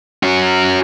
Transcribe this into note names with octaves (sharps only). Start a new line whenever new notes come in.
C#4 F#4